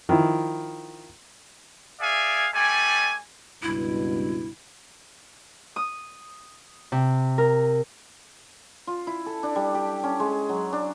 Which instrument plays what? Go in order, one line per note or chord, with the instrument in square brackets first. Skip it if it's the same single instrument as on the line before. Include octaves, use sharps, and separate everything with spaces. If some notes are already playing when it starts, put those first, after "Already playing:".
[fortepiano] D#3 F3 E4
[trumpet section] G#4 D5 E5 F5 G#5
G3 A3 D5 G#5
[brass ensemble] C#2 G2 B2 [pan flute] E4
[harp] D#6
C3
A#4
[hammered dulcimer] F4
E4
A4
D4
G3
G4
C#4
G#3
F#3
D4